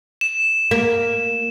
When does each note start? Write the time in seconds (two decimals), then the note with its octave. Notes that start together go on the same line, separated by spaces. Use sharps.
0.21 E7
0.71 A#3